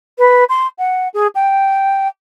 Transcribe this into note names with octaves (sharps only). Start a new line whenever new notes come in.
B4
C6
F#5
G#4
G5